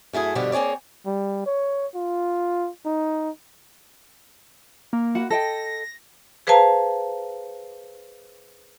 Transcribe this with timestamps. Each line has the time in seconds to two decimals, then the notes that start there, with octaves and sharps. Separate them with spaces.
0.13 F#2 A3 E4 G#4
0.35 G2 B2 D3 F3 G3 D4
0.52 A#3 C4 G#4 C#5 D5
1.06 G3
1.46 C#5
1.95 F4
2.85 D#4
4.93 A#3
5.15 F#4 F#5 B5
5.30 A4 D#5 G5 A#6
6.47 G#4 B4 C5 F5 A5 A#5